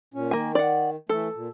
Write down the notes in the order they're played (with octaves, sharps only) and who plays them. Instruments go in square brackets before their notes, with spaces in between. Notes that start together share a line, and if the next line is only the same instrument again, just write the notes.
[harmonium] A#2 C#4
[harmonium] D#3 [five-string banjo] A#3 G#5
[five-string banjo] D5 F#5
[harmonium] E3 A3 [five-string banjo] A4
[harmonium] A#2